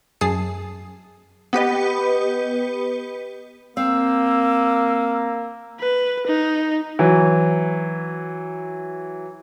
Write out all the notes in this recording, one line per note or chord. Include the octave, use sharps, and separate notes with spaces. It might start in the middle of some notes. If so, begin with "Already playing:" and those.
F#2 G#4 A5 D#6 C7
B3 G4 B4 D#5
A#3 C4 F5 E6
B4
D#4
E3 F#3